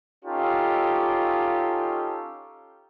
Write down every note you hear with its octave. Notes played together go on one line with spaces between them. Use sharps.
C#4 D#4 F4 G4 A4